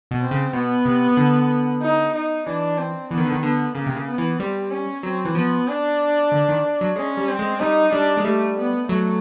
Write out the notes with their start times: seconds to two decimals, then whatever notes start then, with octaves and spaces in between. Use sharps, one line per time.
0.11 B2
0.21 C4
0.31 C#3
0.53 B2 B3
0.85 C3
1.17 D3
1.82 D#4
2.14 D#4
2.46 E3 D4
2.78 C4
3.11 E3 B3
3.17 D#3
3.25 D3
3.32 D#3
3.43 D3 B3
3.75 C#3 A#3
3.86 C3
3.96 C#3
4.07 B3
4.18 E3
4.39 G3 C4
4.71 C#4
5.03 F#3 C4
5.25 E3
5.35 F3 B3
5.68 D4
6.32 D3
6.49 D#3
6.81 F#3
6.96 G#3 C#4
7.17 G3
7.28 C4
7.39 G#3
7.60 G3 D#4
7.92 G3 D4
8.17 G#3
8.24 G3 A3
8.57 B3
8.89 F#3 A3